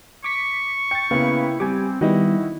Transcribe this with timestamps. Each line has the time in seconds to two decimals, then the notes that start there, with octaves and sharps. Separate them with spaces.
0.24 C#6 D6 B6
0.91 G5 A6 C#7
1.11 C#3 A#3 B3 E4 G5 B5
1.60 G3 C4 G#5 D6
2.01 D#3 G3 B3 E4 F#4 D#5 G5